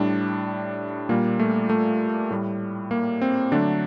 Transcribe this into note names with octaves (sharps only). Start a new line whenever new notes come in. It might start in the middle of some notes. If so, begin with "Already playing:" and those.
Already playing: A2 G3 D4
A#2 G3 A#3
A3
A3
A2 G3
A#3
C4
D3 F#3 A3 D4